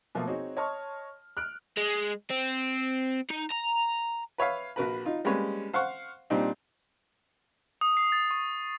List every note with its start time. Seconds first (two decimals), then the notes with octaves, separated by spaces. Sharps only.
0.15 B2 F3 A3 A#3
0.27 C4 D#4 F#4 G#4 C#5
0.57 C#5 D#5 A5 C6 C#6 F6
1.37 F6 F#6 D7
1.77 G#3
2.30 C4
3.31 D#4
3.51 A#5
4.38 B4 C#5 E5 F5
4.76 A#1 F#4 A#4 B4 B5
5.05 D#4 F4
5.25 G3 G#3 A#3 C#4 B4 C#5
5.73 C5 F5 F#5 C#6
6.30 A#2 G3 C4 D4 D#4
7.81 D#6
7.97 C7
8.12 A6
8.31 C#6